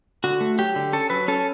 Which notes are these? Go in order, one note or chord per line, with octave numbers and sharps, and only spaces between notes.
D3 F#4
A3
F#3 G4
D3
C#4 A4
F#3 B4
C#4 A4